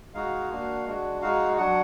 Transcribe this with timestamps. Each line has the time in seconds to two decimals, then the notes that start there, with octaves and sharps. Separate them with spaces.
0.14 G#3 D#4 F#4 F5
0.51 A#3 D4 F#4
0.85 G#3 D4 F#4
1.22 G#3 D#4 F#4 F5
1.57 F#3 D4 F#4 F#5